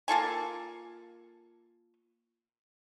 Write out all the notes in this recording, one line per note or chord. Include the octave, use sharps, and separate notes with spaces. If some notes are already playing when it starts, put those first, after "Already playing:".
A#3 F4 A4 G#5